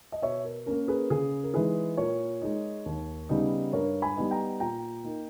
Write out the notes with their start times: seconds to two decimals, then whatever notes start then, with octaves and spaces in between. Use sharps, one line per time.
0.12 D#5
0.22 B2 C#5 E5
0.44 A#4
0.66 A#3 C#4 A#4
0.88 G#4 B4
1.10 C#3 G#4
1.43 A#4
1.54 E3 G#3 D#4 G#4 B4
1.97 A#2 A#4 C#5
2.42 G#3 D#4
2.86 D#2
3.29 C#3 G3 B3 D#4
3.73 G2 A#4 C#5
4.02 G#5 B5
4.17 G3 B3 D#4
4.31 G5 A#5
4.60 A#2 G5 A#5
5.04 A#3 D#4